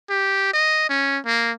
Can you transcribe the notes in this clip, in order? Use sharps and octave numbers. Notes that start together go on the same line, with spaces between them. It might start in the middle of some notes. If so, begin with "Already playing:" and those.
G4
D#5
C#4
A#3